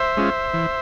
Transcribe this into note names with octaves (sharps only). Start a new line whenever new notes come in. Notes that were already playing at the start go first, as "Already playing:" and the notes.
Already playing: C5 E5
G#3 C#4 F4
E3